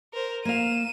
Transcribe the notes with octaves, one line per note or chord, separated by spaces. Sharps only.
A#4 C5
A#3 F5 D#7 E7